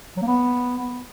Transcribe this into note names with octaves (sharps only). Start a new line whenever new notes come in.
F#3
A#3
B3